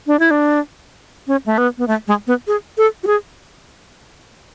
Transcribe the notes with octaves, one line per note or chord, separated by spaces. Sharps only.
D4
E4
D4
C#4
A3
B3
B3
A3
G#3
B3
G#4
A4
F#4
G#4